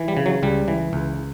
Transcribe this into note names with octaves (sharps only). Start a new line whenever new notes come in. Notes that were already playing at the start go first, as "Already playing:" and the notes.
Already playing: E3
G3
C#3
F#3
C#2 G3
E3
C#2